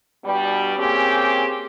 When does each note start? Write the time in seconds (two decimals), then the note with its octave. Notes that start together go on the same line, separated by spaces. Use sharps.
0.24 G2 B2 G3
0.77 A#3 C4 C#4 G4 G#4